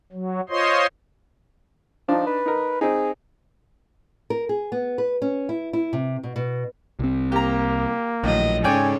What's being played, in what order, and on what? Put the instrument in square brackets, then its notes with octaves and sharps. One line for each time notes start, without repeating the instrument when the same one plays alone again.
[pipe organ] F#3
F4 C5 C#5 D#5 C6
[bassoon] F3 [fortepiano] D4 D#4
[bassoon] B4
[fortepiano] D#4 A#4
[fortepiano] C4 D#4 [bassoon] G#4
[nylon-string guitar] A#4
G#4
B3
B4
C#4
E4
E4
C3
B2
B2
[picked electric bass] C2 C4
[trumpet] A#3 [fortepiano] G4 A#5
[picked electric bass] A#1 [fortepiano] A2 [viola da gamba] D#3 F#3 D#5
[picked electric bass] G#2 [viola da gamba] C#3 A4 C#5 [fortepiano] C#4 D5 G5 [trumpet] G#5